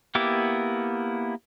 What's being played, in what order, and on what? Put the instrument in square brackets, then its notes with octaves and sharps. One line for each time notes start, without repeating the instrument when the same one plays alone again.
[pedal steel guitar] A#3 B3 E4 G4 D6